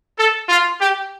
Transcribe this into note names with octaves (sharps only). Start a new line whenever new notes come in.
A4
F4
G4